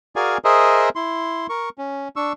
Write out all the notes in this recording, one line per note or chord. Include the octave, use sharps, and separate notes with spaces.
F#4 G#4 A#4 D5 F5 G#5
G#4 A#4 C5 D#5 E5
E4 C6
A#4 C#6
C#4
D4 C#6 E6